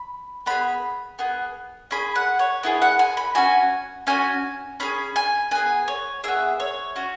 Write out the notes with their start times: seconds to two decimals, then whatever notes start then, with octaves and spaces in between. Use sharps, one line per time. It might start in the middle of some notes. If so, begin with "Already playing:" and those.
Already playing: B5
0.46 B3 G#4 B5
1.19 B3 G#4
1.91 C#4 G#4 B5
2.15 F#5
2.39 C#5
2.63 B3 E4 G#4
2.82 F#5
2.99 G#5
3.17 B5
3.35 C#4 F#4 G#5
4.07 C#4 F#4 G#5
4.80 C#4 G#4 B5
5.16 G#5
5.51 B3 G#4 G#5
5.88 C#5
6.24 E4 G#4 E5
6.28 B3
6.60 C#5
6.96 C#4 F#4